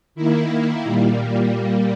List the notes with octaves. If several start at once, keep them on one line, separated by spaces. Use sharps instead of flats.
D#3 A#3 E4
A#2 G3 A#3